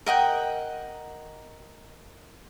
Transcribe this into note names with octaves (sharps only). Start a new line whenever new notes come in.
A#4 D#5 F#5 G5